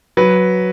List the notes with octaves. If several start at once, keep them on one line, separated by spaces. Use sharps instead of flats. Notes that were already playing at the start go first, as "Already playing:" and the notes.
F#3 B4